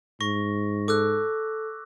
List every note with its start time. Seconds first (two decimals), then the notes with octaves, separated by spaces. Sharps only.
0.20 G#2 C#6 A#6
0.88 A4 D6 E6 F#6